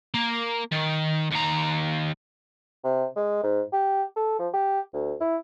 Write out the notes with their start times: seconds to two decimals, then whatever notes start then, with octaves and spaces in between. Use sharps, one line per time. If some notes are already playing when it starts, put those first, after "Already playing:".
0.14 A#3
0.72 D#3
1.31 D#2 A#5
2.84 C3
3.16 G#3
3.43 G#2
3.73 G4
4.17 A4
4.39 F3
4.54 G4
4.93 D2
5.20 E4